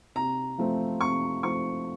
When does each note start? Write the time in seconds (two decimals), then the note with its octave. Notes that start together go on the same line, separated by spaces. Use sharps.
0.15 C3 A#5
0.58 F3 A3 C4
1.01 C3 C#6
1.43 F3 A3 C4 C#6